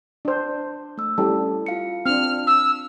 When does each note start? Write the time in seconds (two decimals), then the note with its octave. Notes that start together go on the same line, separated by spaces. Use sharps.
0.25 D4 C5
0.98 A3 E6
1.18 G3 C#4 E4 G4 A4 A5
1.66 F4 F5 C#7
2.06 C4 D4 F6
2.47 E6